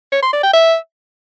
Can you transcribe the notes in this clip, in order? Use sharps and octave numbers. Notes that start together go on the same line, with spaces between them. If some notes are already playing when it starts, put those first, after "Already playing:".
C#5
C6
D5
G5
E5